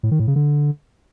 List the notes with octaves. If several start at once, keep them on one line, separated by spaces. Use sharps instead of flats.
A2
D#3
A2
C#3
D3